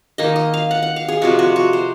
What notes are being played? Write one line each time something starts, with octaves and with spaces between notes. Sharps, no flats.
D#3 A#3 D#4 D#5
D#5
F5
F#5
F#5
F5
G#4
C3 F3 G#3 F#4
F#4
F#4
C5